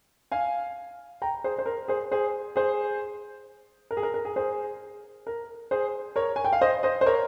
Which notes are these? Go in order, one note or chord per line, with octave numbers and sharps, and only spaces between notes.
F5 G#5
G5 A#5
G#4 C5
C5
A#4
G#4 C5
G#4 C5
G#4 C5
A#4
G#4
A#4
A#4
G#4
G#4 C5
A#4
G#4 C5
A#4 C#5
G#5
G5
F5
C5 D#5
C5 D#5
C5
A#4 C#5